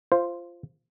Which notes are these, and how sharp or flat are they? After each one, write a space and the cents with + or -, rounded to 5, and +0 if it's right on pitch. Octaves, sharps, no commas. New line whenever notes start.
F4 -15 C5 +0